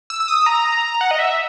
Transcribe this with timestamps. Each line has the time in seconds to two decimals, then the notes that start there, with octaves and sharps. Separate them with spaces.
0.10 E6
0.20 E6
0.28 D#6
0.46 A#5
1.01 F#5
1.11 D#5
1.19 E5